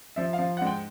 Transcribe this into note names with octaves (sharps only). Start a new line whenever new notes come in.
F3 E5
F5
F3
G#2 F#5
G5